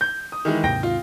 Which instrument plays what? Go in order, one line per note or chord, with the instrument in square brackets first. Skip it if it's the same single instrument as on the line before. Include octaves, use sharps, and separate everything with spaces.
[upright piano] G6
D#6
D#3 E3 G#3
[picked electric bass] D#2 G#2 C3 [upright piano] G5 A#6
[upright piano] F4